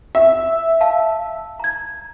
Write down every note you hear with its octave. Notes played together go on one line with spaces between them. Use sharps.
E5
F5 A5
A#5 G#6